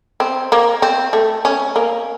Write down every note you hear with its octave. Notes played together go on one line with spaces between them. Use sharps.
C4
A#3
C4
A3
C#4
A#3